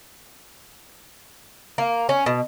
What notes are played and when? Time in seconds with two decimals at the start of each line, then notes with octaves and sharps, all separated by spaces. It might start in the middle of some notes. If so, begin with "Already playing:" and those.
1.78 A#3
2.09 C#4
2.26 B2